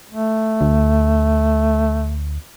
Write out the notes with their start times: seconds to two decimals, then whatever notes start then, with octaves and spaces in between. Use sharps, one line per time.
0.12 A3
0.61 D2